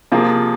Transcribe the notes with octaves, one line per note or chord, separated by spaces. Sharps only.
C3 F3 A#3 F4 G#4